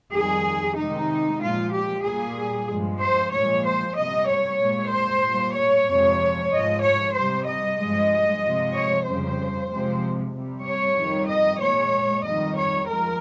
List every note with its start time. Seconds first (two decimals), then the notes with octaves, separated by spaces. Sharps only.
0.14 F2 D#3 G3 G#4
0.77 C3 D#3 G#3 D#4
1.40 A#2 F3 G#3 F4
1.73 G4
2.04 A#2 G3 G#4
2.68 G2 F3 G#3
3.00 C5
3.32 A#2 F3 G#3 C#5
3.64 C5
3.95 C3 G3 D#5
4.27 C#5
4.59 A#2 G#3
4.91 C5
5.23 A#2 G3
5.55 C#5
5.87 F2 C3 F3 G#3
6.50 G#2 F3 G#3 D#5
6.82 C#5
7.14 C3 G3 C5
7.45 D#5
7.77 G2 F3 G#3
8.41 C3 F3 G#3
8.73 C#5
9.05 F2 C#3 G3 C5
9.69 C3 F3 G#3
10.33 C3 G3
10.64 C#5
10.96 F2 D#3 G3
11.27 D#5
11.59 A#2 G#3 C#5
12.23 F2 D#3 G3 D#5
12.56 C#5
12.87 F3 G#3 A#4